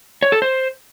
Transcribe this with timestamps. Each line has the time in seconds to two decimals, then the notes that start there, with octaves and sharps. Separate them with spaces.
0.22 C#5
0.32 A4
0.42 C5